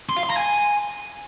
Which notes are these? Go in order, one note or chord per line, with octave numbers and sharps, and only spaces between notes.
C6
F5
C6
A#5
G#5